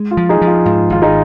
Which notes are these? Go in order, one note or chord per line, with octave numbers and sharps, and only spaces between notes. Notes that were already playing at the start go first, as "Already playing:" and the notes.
Already playing: G#3
F4
F3
D#4 G#4
F3
F4
G#2 F4
G#1 F4
D#4 G#4